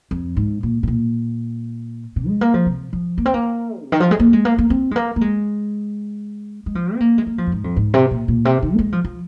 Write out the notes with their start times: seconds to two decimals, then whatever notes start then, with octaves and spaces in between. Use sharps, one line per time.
0.11 F2
0.37 G#2
0.63 A#2
0.83 C3
0.88 A#2
2.16 C3
2.28 G#3
2.41 A#3
2.54 F3
2.66 C3
2.93 F3
3.18 A#3
3.26 C4
3.34 A#3
3.82 C3
3.92 D#3
4.00 F3
4.11 G#3
4.20 A#3
4.33 G#3
4.45 A#3
4.58 A#3
4.70 C4
4.91 G#3
4.96 A#3
5.16 A#3
5.21 G#3
6.66 G#3
6.75 F3
6.95 C4
7.00 A#3
7.18 G#3
7.27 A#3
7.38 F3
7.47 F2
7.52 G#2
7.64 F2
7.77 G#2
7.94 C3
8.11 A#2
8.28 A#2
8.45 C3
8.63 D#3
8.74 A#3
8.79 G#3
8.92 F3
9.04 F3